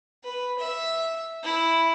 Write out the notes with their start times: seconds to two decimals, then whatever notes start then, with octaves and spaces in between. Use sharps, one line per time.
0.24 B4
0.59 E5
1.43 E4